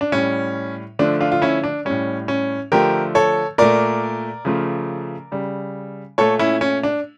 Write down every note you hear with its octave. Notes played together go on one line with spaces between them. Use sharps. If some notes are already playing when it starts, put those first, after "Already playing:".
D4
A2 G3 C#4
D3 F3 A3 D4
D4 F4
F4
C#4 E4
D4
A2 G3 C#4
C#4
D3 F3 A3 G4 A#4
A4 C#5
A#2 A3 A#4 D5
C#3 F3 A3
C#3 G3
A#2 A3 A4 C#5
C#4 E4
C#4
D4